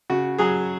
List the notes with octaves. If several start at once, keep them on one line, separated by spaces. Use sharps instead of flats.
C#3 F#4
F#3 G#4